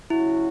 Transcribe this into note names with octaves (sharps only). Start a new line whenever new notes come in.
C#3 F#3 C#4 E4 F#4